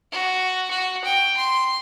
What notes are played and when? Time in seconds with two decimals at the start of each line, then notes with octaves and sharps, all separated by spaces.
0.12 F#4
0.70 F#4
1.04 G5
1.37 C6